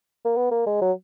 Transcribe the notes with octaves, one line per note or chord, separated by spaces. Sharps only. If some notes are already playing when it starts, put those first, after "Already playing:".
A#3
B3
A#3
G#3
F#3